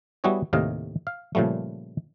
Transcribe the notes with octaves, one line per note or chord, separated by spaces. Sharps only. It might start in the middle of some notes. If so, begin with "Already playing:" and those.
G3 B3 E4 F#4 G#4 C#5
D#2 A2 C3 D#5 F5
F5
A#2 C#3 F3 G3 A3